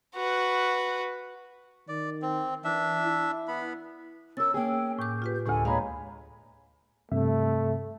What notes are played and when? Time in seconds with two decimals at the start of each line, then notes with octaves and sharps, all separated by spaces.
0.15 F#4 B4
1.88 D#3 D5
2.22 C4
2.64 E3 D4 E5
3.05 E4
3.48 B3 B5
4.37 C#4 A#4 E6 A6
4.54 A#3 C#4 G#4 G5
4.99 A2 D6 G6
5.22 F4 G4 B4
5.46 D2 A2 D3 G#3 A4 G#5
5.65 A#2 G#3 C#5 F5 A#5 B5
7.12 G2 C3 A3 E5